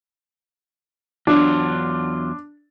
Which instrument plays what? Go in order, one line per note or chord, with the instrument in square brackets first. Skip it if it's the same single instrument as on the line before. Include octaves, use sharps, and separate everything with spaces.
[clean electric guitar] E2 F#3 F4 [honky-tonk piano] D4